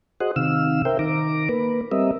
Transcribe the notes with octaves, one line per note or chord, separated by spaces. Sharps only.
F#4 G#4 C5 D#5 F#5
C3 D#3 F5 E6
A#4 C5 E5 G5
D#3 A#5 D6
A#3 B4
G3 C4 A#4 D#5 E5